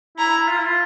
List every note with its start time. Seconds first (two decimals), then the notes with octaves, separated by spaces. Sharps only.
0.18 E4 A#5
0.48 F4
0.58 E4
0.66 F4